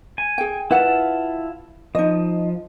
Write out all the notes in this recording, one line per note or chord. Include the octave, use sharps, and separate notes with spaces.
G#5
G#4 G5
E4 F4 B4 F#5 A5
F3 D#4 D#5